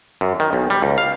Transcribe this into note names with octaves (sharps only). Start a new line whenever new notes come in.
F#2
D#3
B1
G3
C#2
F5